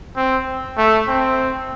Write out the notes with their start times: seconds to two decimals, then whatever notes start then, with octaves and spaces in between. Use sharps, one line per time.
0.16 C4
0.77 A3
1.08 C4